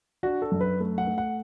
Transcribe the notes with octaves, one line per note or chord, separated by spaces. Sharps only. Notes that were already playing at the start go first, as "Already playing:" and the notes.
D4 F#4
A4
F#2
B4
A3
F#5
A3
F#5